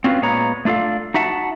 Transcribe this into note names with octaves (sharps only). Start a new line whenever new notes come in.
C4 C#4 F4 F#4 B4 F5
A#2 G#3 B3 C#5 A#5
A3 D4 F4 A4 F5
D#4 F#4 E5 F#5 A5